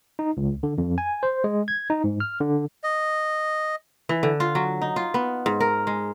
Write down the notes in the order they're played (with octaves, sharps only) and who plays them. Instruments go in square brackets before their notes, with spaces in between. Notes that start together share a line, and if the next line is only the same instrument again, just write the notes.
[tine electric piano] D#4
C#2
D3
F2
G#5
C5
G#3
G#6
D#4
G#2
F6
D3
[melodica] D#5
[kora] E3
D3
F4
F#3
D#4
F4
B3
G#2
A#4
G#3